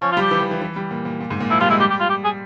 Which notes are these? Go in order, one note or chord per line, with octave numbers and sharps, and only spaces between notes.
F3 C#4
F4
G3 G4
E3
E3
E3
E3
G3
A#2
A#2
A#2
G#2
A#2
F3 E4
G3 F4
G#3 E4
G3 G4
G4
F4
G4
G#4